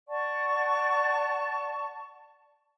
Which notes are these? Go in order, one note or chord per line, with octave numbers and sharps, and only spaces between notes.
D5 F#5 A5 C#6